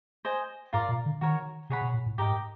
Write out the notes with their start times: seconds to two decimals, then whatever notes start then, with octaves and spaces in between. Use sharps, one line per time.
0.25 C5 D#5 G#5
0.73 G#2 F4 A#4 D5
0.89 A#2
1.06 D3
1.21 D#3 F#4 A#4 C#5
1.70 C3 G#4 C#5 F#5 B5
1.81 B2
1.94 A#2
2.06 A2
2.18 G#2 G4 A#4 D#5 G5